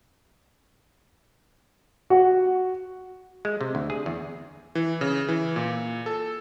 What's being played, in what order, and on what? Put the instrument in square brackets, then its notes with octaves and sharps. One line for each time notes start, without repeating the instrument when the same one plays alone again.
[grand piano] F#4 F#5
[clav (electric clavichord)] G#3
C3
D2
G#4
E2
[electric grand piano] E3
C#3
E3
A#2
A4